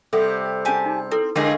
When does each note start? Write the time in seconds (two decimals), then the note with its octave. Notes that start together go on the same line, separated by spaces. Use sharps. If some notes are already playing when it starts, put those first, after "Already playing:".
0.13 C3 G3 G4 A4 E5 F#5
0.65 C#4 G4 G#4 G#5 A5
0.86 D#4
1.11 C4 E4 A4 B4
1.36 D3 F3 G#3 A3 D#4 G#4 A#4 B5